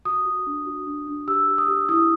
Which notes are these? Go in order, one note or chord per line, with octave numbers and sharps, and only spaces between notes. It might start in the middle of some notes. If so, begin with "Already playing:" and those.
F#4 D#6
F#4
D4
F#4
D4
D4
G4 E6
G4
D#6
G4
E4 D#6